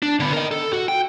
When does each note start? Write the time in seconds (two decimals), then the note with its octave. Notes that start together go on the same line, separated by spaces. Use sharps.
0.02 D4
0.20 D3 B3
0.33 A#4 D#5
0.51 A4
0.73 F#4
0.88 G5